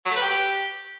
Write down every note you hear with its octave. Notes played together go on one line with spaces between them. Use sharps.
F#3
A3
B4
G4